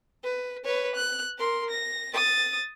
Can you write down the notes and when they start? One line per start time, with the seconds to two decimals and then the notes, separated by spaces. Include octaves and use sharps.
0.23 B4
0.64 B4 C#5
0.95 F#6
1.38 A#4 C6
1.70 A#6
2.13 D#6 A6